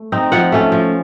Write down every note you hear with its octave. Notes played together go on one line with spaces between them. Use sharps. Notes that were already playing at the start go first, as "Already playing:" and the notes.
Already playing: A3
C4 D#4
F3 F#5
A3 C#4
F3